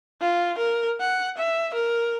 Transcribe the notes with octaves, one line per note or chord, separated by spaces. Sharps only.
F4
A#4
F#5
E5
A#4